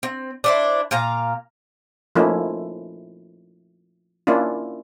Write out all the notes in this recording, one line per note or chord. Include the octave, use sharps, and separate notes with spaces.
C4
D4 E4 C5
A#2 F5 A#5
F3 A3 A#3 C#4 D#4 E4
A#3 C#4 D4 E4 F4